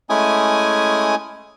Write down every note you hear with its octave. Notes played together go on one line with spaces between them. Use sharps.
G#3 A3 C#4 E4 G#5 D#6